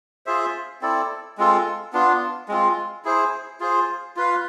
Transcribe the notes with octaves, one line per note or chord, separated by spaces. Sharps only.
F4 G#4 C5 E5
C4 E4 A4 D5
G#3 C4 F4 A4
B3 D4 F4
G#3 C4 F4
E4 G#4 C5
F4 G#4 C5
F4 B4 F5